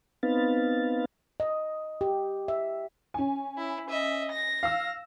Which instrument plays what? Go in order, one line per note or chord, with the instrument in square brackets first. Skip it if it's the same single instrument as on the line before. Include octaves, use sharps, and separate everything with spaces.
[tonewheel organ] B3 C4 D#4 B4 F5 A6
[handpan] D#5
G4
E5
[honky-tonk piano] C#4 G#5
[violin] E4
D#5 E5
A#6
[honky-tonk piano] F5 E6